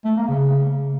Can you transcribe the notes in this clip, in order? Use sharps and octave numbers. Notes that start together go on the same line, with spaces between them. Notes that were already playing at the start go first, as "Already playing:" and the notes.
A3
A#3
C#3